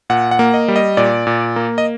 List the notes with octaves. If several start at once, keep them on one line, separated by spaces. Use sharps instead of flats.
A#2 F#5
F#5
A#3
D#5
G3
D#5
A#2 D5
A#2
A#3
D#5